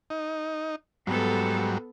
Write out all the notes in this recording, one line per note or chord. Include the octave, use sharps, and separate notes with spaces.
D#4
G#2 F#3 G3 B3 A4